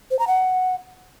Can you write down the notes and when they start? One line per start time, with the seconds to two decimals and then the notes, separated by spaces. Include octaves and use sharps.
0.11 C5
0.19 A#5
0.27 F#5